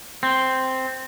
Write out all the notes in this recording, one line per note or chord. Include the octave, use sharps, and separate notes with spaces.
C4